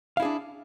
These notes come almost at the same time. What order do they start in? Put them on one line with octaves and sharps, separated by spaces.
F5 E4 G#4 D4